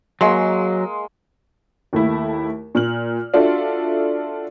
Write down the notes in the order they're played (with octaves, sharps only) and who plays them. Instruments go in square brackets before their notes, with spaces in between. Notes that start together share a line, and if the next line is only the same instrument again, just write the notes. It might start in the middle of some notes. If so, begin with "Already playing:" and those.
[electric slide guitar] F#3 [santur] G#3 A#3 C6
[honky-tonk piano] D#2 A3 E4
A#2 F6 F#7
D4 F4 F#4 A4 E5